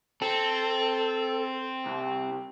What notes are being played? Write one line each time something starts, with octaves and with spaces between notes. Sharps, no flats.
C4 A4
C2